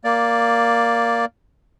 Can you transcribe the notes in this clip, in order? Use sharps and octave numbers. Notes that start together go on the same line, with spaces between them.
A#3 D5